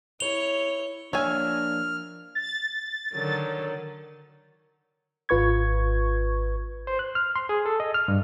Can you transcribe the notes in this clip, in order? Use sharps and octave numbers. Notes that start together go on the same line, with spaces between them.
E4 C#5 F7 G7
F3 A#3 D4 C#5 E5 G#5 E6 F6
A6
D3 D#3 F#3
G#1 F4 B4 C#6 G#6
C5
F#6
F6
C6
G#4
A4
D#5
F6
G2